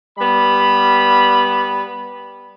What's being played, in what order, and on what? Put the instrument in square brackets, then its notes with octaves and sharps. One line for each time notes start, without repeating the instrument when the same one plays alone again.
[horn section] G3 B3 B5